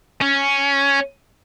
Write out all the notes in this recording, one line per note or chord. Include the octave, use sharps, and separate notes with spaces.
C#4